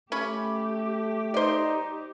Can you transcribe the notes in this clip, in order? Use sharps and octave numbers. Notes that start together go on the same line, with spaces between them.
A3 C#4 G4 B5
D#4 C5 D5